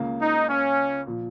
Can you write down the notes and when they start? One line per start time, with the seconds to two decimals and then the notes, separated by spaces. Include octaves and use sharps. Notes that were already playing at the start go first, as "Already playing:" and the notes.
Already playing: C#2 C#3 A#3
0.20 D#4
0.49 C#4
1.07 A#2 F3